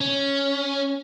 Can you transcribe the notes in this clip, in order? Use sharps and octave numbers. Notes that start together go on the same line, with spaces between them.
C#4